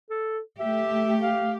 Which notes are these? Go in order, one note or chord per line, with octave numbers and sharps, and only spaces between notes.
A4
A3 G4 E5
F5